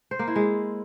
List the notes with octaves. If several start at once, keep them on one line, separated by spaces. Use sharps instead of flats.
C5
A#3
E4
G#3